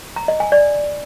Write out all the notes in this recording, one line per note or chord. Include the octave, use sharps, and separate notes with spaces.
A#5
D#5
G#5
D5